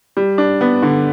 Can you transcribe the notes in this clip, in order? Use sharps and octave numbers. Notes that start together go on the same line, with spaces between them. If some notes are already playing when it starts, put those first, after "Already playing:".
G3
D4
B3
D3